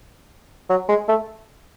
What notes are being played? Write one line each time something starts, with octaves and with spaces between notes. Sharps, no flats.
F#3
G#3
A3